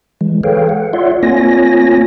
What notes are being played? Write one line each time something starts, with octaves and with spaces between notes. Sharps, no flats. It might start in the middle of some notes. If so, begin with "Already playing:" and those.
E3 G#3
G#4 A4 B4 C#5 F5 G5
F#5
F4 C#5 D5 E5 F#5 C6
A#3 C4 F4 C#5 G#5 A#6